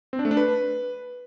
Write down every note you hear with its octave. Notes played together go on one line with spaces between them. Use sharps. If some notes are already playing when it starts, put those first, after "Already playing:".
C4
D4
A3
D4
B4